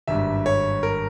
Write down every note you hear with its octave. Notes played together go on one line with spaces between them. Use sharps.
G#1 G2 G3 E5
C#5
A#4